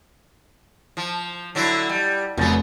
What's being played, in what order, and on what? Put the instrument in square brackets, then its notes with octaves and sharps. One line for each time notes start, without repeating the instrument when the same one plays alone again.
[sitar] F3
D3 F#3 E4
G3
[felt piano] F1 A6 [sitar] F#2 B3